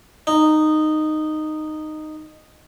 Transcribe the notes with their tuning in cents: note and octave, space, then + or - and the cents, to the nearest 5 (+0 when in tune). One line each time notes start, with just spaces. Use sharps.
D#4 -10